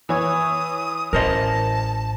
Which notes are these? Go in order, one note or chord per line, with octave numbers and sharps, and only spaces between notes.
E3 C#5 D#6
A1 A#4 C5 D#5 A5